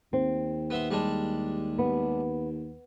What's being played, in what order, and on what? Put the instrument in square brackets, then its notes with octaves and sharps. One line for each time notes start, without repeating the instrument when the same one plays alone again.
[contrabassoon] D#2 [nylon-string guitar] C4
[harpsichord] B3 E5 C6
G3 G#3 D4
[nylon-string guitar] B3